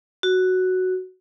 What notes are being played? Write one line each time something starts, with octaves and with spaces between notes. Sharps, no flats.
F#4